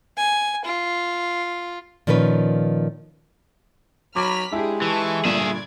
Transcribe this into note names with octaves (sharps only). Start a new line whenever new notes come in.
G#5
F4
A#2 D#3 F3 C#4 B4
F#3 B5 D6 F6 B6
G#3 D4 E4 G4 G#4
E3 G#4 A4 C#6
G1 G2 A#2 G#4 D5 E5 G#6